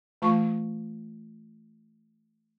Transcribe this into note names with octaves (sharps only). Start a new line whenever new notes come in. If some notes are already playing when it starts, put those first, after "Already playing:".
E3 A3 F4 F5 A5 C#6